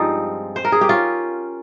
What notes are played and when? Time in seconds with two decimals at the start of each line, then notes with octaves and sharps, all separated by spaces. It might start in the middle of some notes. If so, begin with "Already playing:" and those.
Already playing: G2 F3 G#3 C4 D#4 F4
0.56 C5
0.65 A#4
0.72 G#4
0.81 G4
0.89 C#4 F4